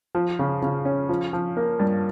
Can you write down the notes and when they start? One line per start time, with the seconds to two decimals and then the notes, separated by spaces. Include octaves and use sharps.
0.15 F3
0.39 C#3
0.62 C#3
0.85 C#4
1.09 F3
1.33 F3
1.57 A#3
1.80 G2